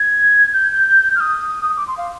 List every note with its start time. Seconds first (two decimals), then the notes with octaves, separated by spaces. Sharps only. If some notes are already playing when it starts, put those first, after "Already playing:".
Already playing: G#6
0.53 G6
1.16 F6
1.20 D#6
1.77 D6
1.87 C6
1.98 F5